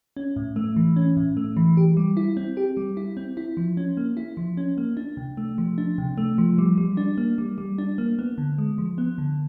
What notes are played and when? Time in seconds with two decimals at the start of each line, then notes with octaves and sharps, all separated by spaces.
0.17 C#4
0.36 A2
0.56 A3
0.76 E3
0.96 C#4
1.17 A2
1.37 A3
1.57 E3
1.77 G4
1.97 G3
2.17 E4
2.37 C4
2.57 G4
2.77 G3
2.97 E4
3.17 C4
3.37 E4
3.57 F3
3.77 C#4
3.97 A#3
4.17 E4
4.37 F3
4.57 C#4
4.78 A#3
4.97 D4
5.17 C3
5.37 A3
5.58 F3
5.78 D4
5.98 C3
6.18 A3
6.38 F3
6.58 G3
6.78 G3
6.97 D4
7.18 A#3
7.38 G3
7.58 G3
7.78 D4
7.98 A#3
8.19 B3
8.38 D3
8.58 G#3
8.78 F3
8.98 B3
9.18 D3